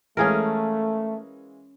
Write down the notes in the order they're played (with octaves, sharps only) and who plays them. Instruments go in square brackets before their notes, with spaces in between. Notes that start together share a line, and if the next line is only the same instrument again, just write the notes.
[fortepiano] E3 G#3 F5 [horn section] A3 [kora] C#4 G#4 A#4